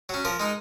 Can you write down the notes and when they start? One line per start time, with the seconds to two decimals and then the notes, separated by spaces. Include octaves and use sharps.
0.09 F#3 C#4
0.25 F3 A#4
0.40 G#3 D#4